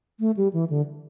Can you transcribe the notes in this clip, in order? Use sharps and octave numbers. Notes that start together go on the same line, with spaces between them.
A3
G3
E3
D3